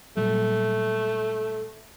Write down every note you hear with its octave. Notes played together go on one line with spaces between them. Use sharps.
A#2 F#3 G3 A3